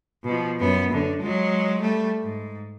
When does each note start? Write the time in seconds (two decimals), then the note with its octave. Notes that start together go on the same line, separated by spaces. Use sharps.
0.24 B2 F3
0.60 F#2 B3
0.92 F#2 D3
1.21 F#3 G#3
1.80 G3 A3
2.23 G#2